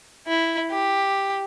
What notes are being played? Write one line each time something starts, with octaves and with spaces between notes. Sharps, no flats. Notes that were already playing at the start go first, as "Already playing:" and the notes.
E4
G4